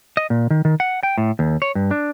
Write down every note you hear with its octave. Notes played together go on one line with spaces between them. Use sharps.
D#5
A#2
D#3
D#3
F#5
G5
A2
D#2
C#5
G2
D4